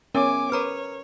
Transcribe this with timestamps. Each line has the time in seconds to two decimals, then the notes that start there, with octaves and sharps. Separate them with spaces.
0.15 B3 C#4 A#4 G#5 D6
0.52 A#4 B4 C#5 A#5 F6